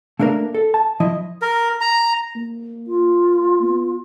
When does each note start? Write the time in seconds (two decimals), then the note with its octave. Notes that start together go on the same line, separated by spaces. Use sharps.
0.19 A3 A#3 D4 G#4 A#4
0.54 A4
0.74 A5
1.00 F3 E4 D#5
1.42 A#4
1.81 A#5
2.36 A#3
2.87 F4
3.63 B3